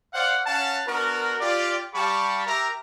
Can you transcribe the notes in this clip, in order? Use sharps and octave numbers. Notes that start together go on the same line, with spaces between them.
C5 D5 F5 F#5
C#4 F5 F#5 A5
B3 D4 F#4 A#4
F4 G4 D5
G3 G4 F5 A5 B5 C#6
G4 A#4 E5 A#5